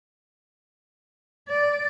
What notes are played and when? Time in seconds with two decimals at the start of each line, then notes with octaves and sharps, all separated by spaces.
1.49 D5